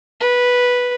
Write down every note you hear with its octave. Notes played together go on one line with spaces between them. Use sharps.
B4